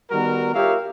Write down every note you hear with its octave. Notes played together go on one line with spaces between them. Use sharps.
D#3 G3 B3 F#4 A#4
F4 G4 A#4 C#5 E5 F5